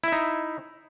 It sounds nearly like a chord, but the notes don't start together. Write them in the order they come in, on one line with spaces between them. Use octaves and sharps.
E4 E5 D#4